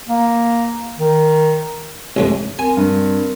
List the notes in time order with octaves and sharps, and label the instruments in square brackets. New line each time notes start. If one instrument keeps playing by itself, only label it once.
[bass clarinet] A#3
D#3
[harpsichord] C2 F2 G#2
[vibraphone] C4 A#4 [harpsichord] G#5
[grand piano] G2